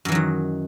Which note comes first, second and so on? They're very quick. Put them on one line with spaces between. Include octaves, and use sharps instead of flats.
F#2 E3 F#3 D#3